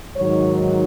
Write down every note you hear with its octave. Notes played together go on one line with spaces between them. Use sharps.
G#2 D#3 F#3 C#5